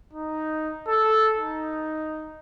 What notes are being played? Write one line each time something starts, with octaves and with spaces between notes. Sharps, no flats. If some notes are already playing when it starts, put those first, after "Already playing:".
D#4
A4
D#4